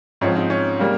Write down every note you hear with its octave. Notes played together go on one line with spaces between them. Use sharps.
G#2 F3 C4 C#4
D#4
C#4
C#3 G3 A#3